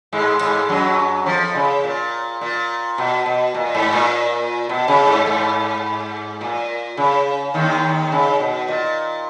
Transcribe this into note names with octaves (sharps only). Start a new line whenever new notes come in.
G#2 G#3
G#2 G#3
F#2 F#3
F2 F3
C#3
A#2
A#2
B2
B2
A#2
G#2
A#2
B2
C#3
G#2
G#2
A#2
C#3
D#2 D#3
C#3
B2
A#2